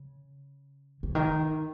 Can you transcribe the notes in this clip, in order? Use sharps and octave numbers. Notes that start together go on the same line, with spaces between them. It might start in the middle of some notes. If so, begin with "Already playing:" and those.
Already playing: C#3
C#3
D#3